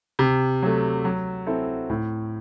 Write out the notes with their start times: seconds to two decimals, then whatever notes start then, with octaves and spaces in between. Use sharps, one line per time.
0.19 C3
0.62 F#3 A3
1.05 F#3
1.47 C4 E4 A4
1.90 A2